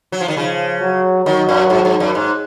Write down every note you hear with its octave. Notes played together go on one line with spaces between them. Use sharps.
F#3
F3
D#3
C#3 F3
F#3
D#3 F#3
F#2
G#2
G#2
F#2
G#2